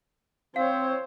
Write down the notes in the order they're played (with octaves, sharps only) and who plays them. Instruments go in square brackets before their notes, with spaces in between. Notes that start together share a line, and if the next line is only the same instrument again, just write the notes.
[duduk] C4 [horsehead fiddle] C5 C#5 [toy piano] F5